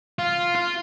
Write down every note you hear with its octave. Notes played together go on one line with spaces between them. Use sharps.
F4
F4